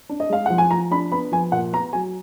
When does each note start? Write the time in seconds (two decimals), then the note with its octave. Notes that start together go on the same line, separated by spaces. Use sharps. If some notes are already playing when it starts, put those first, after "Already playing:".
0.09 D4
0.20 D#5
0.30 G#3 F5
0.46 F3 F#5
0.58 G#5
0.71 F3 A#5
0.91 D4 B5
1.12 B3 B5
1.32 F3 G#5
1.52 A#2 F#5
1.73 B3 A#5
1.93 F#3 G#5